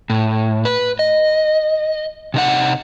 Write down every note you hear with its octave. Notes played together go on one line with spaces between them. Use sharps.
A2
B4
D#5
C3 D#4 F#5